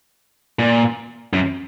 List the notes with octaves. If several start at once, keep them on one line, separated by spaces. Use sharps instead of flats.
A#2
F#2